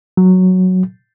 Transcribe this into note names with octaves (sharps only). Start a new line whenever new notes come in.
F#3